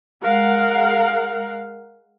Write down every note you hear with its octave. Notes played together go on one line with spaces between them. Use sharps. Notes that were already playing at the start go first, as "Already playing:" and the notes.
G#3 A#4 F5 F#5